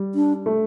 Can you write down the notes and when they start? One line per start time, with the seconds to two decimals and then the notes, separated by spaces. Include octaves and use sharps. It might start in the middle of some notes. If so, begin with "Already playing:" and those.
Already playing: G3
0.15 D4
0.46 A3